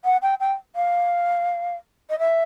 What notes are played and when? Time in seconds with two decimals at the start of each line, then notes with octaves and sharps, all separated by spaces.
0.04 F#5
0.22 G5
0.40 G5
0.76 F5
2.10 D#5
2.19 E5